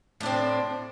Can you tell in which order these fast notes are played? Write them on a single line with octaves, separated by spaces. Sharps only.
A2 D4 C4